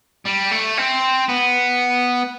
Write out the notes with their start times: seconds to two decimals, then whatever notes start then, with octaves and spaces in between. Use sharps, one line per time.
0.26 G3
0.51 A3
0.77 C4
1.29 B3